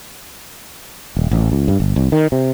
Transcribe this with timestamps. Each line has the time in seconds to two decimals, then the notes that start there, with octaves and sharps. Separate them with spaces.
1.17 D#1
1.31 A1
1.52 C#2
1.68 G2
1.80 G1
1.96 C2
2.12 D#3
2.32 C3